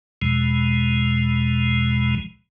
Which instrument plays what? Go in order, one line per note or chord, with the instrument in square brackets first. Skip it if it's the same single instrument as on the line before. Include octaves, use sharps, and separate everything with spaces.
[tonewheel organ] E2 B2 F3 G#3